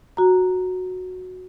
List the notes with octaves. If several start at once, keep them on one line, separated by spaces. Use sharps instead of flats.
F#4 A#5